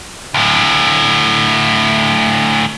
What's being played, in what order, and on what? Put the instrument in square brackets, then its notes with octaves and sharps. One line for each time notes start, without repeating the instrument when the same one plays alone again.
[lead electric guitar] D2 A2